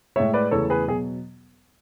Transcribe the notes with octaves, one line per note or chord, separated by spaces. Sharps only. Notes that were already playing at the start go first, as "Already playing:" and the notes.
A2 G#3 C#5 E5
B4 D5
E2 C#3 E3 A3 A4 C#5
G#4 B4
B2 F#3 G#4